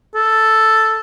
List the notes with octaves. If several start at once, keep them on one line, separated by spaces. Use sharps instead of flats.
A4